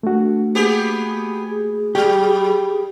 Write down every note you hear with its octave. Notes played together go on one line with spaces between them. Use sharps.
A3 D4 F#4
A#3 B3 G4 G#4
G#4
F#3 G4